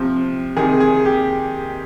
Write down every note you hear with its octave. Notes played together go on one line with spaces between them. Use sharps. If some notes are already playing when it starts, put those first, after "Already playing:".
Already playing: C3 F3
C3 D#3 G#4
G#4
G4